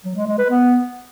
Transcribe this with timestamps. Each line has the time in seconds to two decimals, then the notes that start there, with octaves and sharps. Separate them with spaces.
0.05 F#3
0.16 G#3
0.27 G#3
0.38 B4
0.50 B3